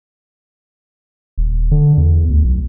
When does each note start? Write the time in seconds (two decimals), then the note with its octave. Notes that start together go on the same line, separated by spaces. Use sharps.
1.38 D#1
1.71 D3
1.97 E2
2.30 D2
2.44 B1